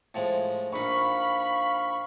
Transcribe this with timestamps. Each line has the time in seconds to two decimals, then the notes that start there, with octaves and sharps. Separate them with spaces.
0.14 A2 F3 G#3
0.72 A#1 D#4 F5 B5 C#6